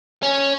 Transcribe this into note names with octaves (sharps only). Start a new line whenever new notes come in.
C#4